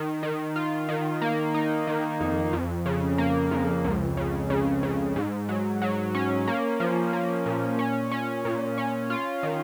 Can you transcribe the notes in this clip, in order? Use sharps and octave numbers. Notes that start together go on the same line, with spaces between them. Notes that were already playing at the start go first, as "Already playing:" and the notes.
Already playing: D#3
D#3
F4
D#3
A#3
D#4
D#3
F2
F2
C#3
A#3
F2
C#2
C#3
C#3
C#3
G#2
F#3
F#3
C#4
A#3
F3
A#3
A#2
C#4
C#4
A#2
C#4
F4
D#3